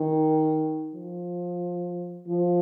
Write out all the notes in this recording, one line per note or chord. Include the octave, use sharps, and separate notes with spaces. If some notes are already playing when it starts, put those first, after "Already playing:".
Already playing: D#3
F3
F3